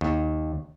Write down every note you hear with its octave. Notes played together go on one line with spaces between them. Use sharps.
D#2